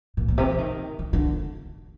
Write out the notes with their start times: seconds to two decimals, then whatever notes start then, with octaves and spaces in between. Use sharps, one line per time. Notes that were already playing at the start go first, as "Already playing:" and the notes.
0.17 A#2
0.28 A#2
0.38 C3
0.48 F3
0.58 D#3
0.99 D#3
1.13 D3